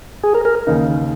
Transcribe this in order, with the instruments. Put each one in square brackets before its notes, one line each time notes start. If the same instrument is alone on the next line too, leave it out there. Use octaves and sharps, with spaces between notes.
[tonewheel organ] G#4
A#4
A#4
[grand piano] D#2 C#3 A#3 D#4